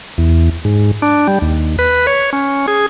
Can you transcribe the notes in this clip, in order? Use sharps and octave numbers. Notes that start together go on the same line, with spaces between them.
E2
G#2
D4
G3
D#2
B4
C#5
C#4
G#4